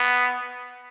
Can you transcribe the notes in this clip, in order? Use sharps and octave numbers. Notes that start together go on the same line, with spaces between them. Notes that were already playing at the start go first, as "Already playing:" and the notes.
Already playing: B3